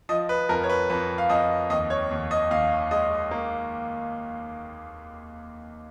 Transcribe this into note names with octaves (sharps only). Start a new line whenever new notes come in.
F3 D#5
B4
F2 A#4
C#5
B4
F2 B4
F5
F2 D#5
D#2 D#5
C#5
D#2
D#5
D#2 F5
G#3 D#5
A#3